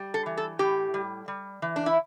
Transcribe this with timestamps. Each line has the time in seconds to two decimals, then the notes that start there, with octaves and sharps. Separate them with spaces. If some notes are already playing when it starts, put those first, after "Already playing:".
Already playing: G3
0.14 A4
0.26 E3
0.37 A4
0.59 A2 G4
0.94 G3
1.28 G3
1.62 E3
1.76 D4
1.86 E4